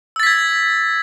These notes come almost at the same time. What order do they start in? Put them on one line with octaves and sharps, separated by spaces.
E6 A6 B6 G#6